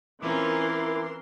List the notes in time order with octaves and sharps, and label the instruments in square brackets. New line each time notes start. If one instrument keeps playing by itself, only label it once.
[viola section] E3 A#4 C6 [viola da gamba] C4 C#4 F4 [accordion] E4 D6